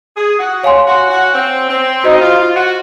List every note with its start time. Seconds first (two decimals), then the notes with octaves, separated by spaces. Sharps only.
0.16 G#4
0.39 F#4
0.63 C#5 F5 G#5 C6
0.87 F#4
1.10 F#4
1.34 C4
1.69 C4
2.04 D#4 F#4 C5 D#5
2.21 F4
2.40 F4
2.56 F#4